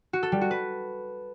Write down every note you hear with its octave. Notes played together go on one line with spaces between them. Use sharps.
F#4
A4
G3
F#4
B4